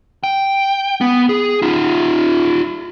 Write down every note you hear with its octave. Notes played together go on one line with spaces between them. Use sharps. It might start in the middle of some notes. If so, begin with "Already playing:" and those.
G5
B3
G#4
D#4 F4